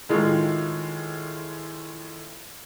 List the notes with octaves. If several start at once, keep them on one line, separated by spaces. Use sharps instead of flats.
A2 D#3 G#3 A3 F4